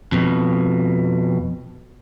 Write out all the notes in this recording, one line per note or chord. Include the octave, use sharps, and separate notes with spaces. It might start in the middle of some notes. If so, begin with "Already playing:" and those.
F2 B2